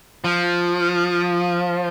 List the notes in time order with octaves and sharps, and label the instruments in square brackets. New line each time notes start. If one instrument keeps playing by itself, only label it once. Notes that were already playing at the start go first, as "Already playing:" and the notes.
[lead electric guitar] F3